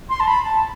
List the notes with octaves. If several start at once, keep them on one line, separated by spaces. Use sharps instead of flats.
C6
A5
B5
A5